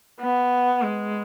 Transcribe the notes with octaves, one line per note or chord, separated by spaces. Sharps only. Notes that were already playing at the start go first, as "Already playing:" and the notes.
B3
G#3